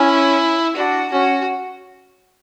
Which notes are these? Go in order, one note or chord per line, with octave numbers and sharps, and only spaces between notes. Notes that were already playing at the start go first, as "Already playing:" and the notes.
Already playing: C#4 E4
D4 F#4
C#4 F#4